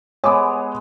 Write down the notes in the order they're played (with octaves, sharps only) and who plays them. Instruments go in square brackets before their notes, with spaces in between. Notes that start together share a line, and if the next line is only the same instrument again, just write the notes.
[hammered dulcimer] G#3 B3 [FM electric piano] C#5 D#6 [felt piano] G#5 D6